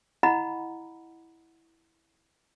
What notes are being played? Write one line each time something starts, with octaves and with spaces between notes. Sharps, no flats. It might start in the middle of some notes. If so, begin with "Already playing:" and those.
E4 D#5 F#5 A#5 B5